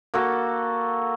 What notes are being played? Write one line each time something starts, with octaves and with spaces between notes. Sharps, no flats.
A#3 F#4 A4